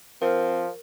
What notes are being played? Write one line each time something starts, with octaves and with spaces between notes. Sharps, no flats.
F3 C4 A#4